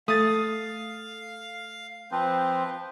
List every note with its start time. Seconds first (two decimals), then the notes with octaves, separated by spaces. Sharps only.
0.08 A3 F5 D#6 A6
2.11 F3 C4 B4 C5